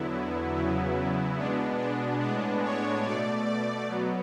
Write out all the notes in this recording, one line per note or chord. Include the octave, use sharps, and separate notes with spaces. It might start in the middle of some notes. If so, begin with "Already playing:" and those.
Already playing: E2 D3 F#3 B3 E4
E2 C#3 F#3 B3
B2 G#3 B3 D4
D4
A2 G#3 B3 D4
C#5
B2 A3 D5
D5
B2 F#3 B3